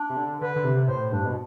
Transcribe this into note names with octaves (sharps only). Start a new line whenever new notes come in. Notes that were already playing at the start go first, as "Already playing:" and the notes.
Already playing: D4
C3
D3
D3 B4
D3
C3
A2 C5
G2 D4
B2